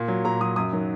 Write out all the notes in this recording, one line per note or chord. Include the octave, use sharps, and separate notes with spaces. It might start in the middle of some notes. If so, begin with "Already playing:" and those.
Already playing: A#2
F#3
A#2 A#5
F#3 D#6
F#2 D#6
D#3 F#3